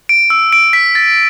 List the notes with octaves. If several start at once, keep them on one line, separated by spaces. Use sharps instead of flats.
D7
E6
D7
B6
A6